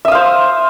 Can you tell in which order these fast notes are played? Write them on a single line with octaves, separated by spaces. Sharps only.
E5 D#6 F5 C5